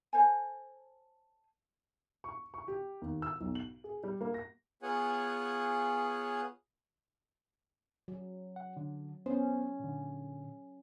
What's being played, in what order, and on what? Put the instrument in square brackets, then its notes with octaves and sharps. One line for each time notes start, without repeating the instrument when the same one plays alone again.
[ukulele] A4 C5 C#5 G#5
[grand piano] C#6
C#6
G4
D#2
E6
B1
F#7
G#4
G3
A#3
A#6
[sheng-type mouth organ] B3 F4 G#4 C#5 F#5 G#5
[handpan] F#3
[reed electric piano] F#5
D3
[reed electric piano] B3 C5 [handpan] C#4
[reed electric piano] A#2 D3